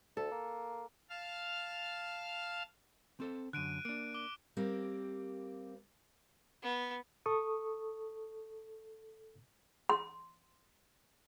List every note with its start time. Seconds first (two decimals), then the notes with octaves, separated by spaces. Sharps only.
0.17 D2 A4
0.31 A#3
1.10 F5 A5 F6
3.20 C4 A4 C5
3.53 F#2 D3 F#6 D7 D#7
3.85 A#3 D4 D7
4.14 D6 G7
4.57 G3 A#3 C4 G4
6.63 B3
7.26 A4 C#6 D#6
9.89 C6